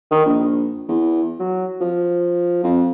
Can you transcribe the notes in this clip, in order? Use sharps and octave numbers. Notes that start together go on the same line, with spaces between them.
D#3
A#1
E2
F#3
F3
F2